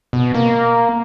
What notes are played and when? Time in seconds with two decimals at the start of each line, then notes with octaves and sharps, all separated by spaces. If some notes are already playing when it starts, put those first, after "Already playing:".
0.13 B2
0.34 A#3